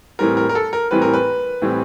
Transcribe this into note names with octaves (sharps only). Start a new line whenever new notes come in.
A2 E3 G3 C4 A#4
A#4
A#4
A4
A#4
A2 E3 G3 C4 B4
A#4
B4
A2 E3 G3 C4